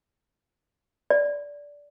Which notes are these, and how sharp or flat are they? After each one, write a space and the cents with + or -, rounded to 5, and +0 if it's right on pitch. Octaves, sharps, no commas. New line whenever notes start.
D5 -15